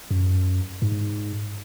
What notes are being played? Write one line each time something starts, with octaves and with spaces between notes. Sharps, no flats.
F#2
G#2